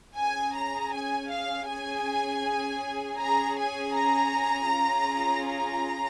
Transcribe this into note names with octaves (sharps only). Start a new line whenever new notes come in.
C#4 G#4 G#5
A#5
G#5
F5
C#4 G#4 G#5
C#4 G#4 A#5
G#5
A#5
C#4 F4 G#4
A#5